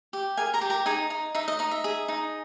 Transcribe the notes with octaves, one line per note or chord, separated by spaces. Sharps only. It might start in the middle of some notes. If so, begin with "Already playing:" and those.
G4
G#4 A#4 G#5
A#4 A#5
G4
A#4 A#5
D#4 G#4 G#5
D#4
D#4 E5
D#5
D#4 D#5
E5
G#4
D#4